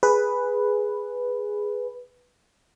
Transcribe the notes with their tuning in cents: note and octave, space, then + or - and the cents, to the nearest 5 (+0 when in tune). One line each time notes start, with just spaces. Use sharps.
G#4 +0 B4 +0